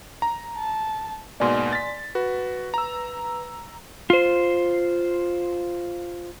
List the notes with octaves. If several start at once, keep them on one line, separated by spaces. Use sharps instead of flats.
A#5
A5
G#2 B2 A#3 D5 G#5 C6
A6 B6
F#4 B4
A#5 E6
F4 C5